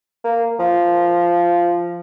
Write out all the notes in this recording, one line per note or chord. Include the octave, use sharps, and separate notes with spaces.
A#3
F3